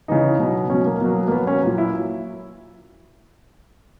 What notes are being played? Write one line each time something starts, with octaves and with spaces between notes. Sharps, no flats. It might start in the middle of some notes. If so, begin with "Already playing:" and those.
C#3 E3 D#4
B2 F#3
B2 F#3 C#4
A#3
B2 F#3
A#3
B2 F#3 B3
C#4
A#2 F#3
E4